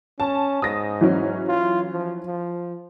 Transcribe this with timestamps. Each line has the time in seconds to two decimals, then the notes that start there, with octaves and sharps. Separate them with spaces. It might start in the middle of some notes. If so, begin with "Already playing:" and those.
0.20 C#4 A5
0.62 G#2 D#6 A#6
1.01 E3 F#3 C#4
1.48 F4
1.92 F3
2.26 F3